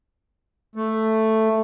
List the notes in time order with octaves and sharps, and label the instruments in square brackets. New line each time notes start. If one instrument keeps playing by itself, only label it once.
[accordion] A3